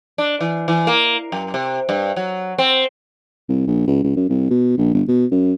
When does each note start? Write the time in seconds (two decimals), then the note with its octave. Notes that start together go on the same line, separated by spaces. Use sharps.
0.18 D4
0.41 E3
0.68 E3
0.87 A#3
1.32 F#2
1.54 C3
1.89 G2
2.16 F#3
2.58 C4
3.49 C2
3.67 A#1
3.87 C#2
4.04 C#2
4.16 F#2
4.29 C2
4.50 B2
4.78 A#1
4.94 G1
5.08 B2
5.31 F#2